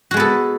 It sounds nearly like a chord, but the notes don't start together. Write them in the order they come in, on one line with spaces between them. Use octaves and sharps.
F#4 G#3 B3 A4